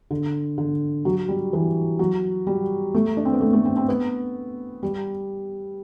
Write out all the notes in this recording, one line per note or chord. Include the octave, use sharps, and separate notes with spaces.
D3
D3
F#3
G3
E3
F#3
G3
A3
D4
C4
B3
A3
A3
C4
C4
B3
G3